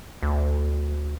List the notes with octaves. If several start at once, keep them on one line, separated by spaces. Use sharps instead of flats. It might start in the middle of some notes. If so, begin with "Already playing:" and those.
D2